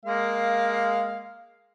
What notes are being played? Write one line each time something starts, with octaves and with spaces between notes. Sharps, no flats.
G#3 A#3 F5